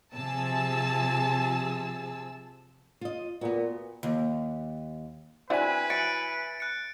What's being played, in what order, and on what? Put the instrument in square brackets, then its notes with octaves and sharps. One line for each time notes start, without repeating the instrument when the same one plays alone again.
[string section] C3 F3 G#4 A5 E6
[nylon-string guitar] F4 D#5
[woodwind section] A#2 [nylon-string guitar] B3 F#4
[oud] D#2
[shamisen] C4 D4 F#4 [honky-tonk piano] E4 G#5 [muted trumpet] B4
[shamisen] F#3 [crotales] A6 C#7 D7
[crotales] F#6 C#7